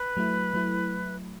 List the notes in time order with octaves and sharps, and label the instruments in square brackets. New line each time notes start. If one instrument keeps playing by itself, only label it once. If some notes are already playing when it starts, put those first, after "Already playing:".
Already playing: [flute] B4
[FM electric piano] F#3 A3 E4
F#3 A3 E4